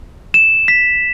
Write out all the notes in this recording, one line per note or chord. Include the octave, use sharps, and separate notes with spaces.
E7
B6